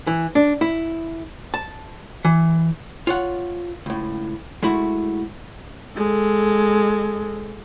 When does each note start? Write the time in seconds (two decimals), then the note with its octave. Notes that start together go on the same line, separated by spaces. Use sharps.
0.07 E3
0.35 D4
0.61 E4
1.54 A5
2.25 E3
3.07 F4 C#5 F#5
3.86 C#2 A2
4.63 G#3 A3 E4 F#4
5.95 G#3 A4